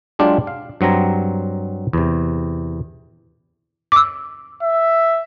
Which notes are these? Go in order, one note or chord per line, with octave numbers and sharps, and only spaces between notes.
F#3 G#3 D4 F4 G4
F5
G2 F#3 C4 A#5
E2 C3
D6 E6
E5